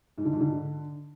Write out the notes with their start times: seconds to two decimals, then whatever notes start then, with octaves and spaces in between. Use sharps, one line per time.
0.18 G#2
0.25 D3
0.33 G#2
0.41 D3